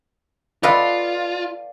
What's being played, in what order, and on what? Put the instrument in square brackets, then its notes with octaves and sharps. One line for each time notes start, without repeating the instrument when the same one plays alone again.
[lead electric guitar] F4 [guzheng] A4 B4 D#5 [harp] D5 F5